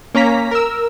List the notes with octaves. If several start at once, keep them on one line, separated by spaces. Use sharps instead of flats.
A#3 C#4 A#5 B6
A#4 E6